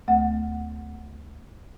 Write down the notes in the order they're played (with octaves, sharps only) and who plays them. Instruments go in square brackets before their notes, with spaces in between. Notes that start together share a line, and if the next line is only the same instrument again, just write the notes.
[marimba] D2 A3 F#5